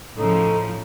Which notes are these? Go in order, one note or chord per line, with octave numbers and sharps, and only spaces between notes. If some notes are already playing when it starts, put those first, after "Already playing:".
A2 C#3 F3 D#4 A4